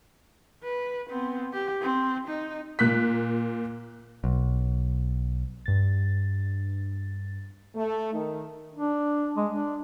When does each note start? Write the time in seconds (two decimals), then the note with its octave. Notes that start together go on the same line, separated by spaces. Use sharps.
0.63 B4
1.10 B3 C4
1.53 G4
1.82 C4
2.28 D#4
2.79 A#2 F#6 B6
4.24 B1
5.66 G2 A6
7.75 A3
8.13 D#3
8.75 D4
9.37 G#3
9.53 D4